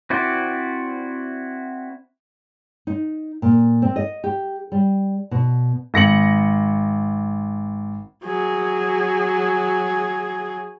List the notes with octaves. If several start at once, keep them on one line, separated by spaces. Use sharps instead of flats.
C4 E4 F#4 D5
D#4
A#2
C4
D#5
G4
G3
B2
G#1 A#6 C#7 F#7
F#3 G#4